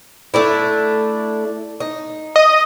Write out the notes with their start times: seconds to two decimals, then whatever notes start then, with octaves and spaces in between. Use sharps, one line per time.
0.34 A3 D4 E4
1.80 D#4
2.36 D#5